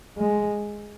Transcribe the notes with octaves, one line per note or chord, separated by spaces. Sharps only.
G#3